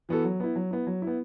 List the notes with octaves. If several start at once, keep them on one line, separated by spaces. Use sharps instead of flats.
E3 B3 F#4 A4
F#3
B3 E4
F#3
B3 E4
F#3
B3 E4